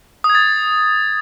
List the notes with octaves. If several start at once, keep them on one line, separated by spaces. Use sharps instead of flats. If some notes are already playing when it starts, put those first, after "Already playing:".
D#6
G#6
A6